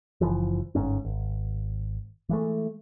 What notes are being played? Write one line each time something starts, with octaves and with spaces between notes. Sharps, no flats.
F#1 E3 F3
G1 G#2 C#4
G#1
E3 G#3 A3